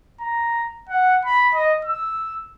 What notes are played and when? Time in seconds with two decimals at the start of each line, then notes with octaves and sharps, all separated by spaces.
0.20 A#5
0.89 F#5
1.25 B5
1.55 D#5
1.85 E6